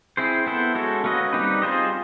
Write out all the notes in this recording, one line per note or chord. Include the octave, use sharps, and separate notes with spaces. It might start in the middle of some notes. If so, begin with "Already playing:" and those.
C4 E4 G#4 C5
B3 E4 A4 C5
G#3 C#4 F#4 A4
A#3 C#4 F#4 B4 D#5
G3 C4 D#4 G4 B4
C4 F4 G#4 C5 D#5